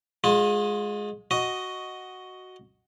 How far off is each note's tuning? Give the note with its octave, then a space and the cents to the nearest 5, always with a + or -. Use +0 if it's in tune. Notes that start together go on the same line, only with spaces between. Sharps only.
G#3 +0 F4 +40
F#4 +0 D#5 +0